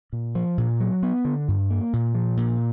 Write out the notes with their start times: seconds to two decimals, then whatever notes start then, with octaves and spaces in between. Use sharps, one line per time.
0.13 A#2
0.35 F3
0.58 A#2
0.80 F#3
1.03 B3
1.25 D3
1.48 G2
1.70 A#3
1.93 A#2
2.15 F3
2.37 A#2